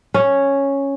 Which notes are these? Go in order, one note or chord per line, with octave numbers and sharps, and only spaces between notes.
C#4